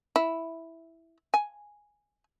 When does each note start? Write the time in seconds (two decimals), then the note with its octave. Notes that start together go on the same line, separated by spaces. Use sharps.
0.16 E4
1.34 G#5